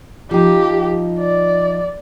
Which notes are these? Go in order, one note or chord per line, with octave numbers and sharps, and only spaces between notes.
F3 D#4 G4
D5